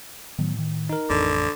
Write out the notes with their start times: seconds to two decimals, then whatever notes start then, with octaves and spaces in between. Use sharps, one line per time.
0.39 A2 D#3 F#3 B3
0.59 D#3
0.89 D#4 A#4
1.10 A1 F2 D3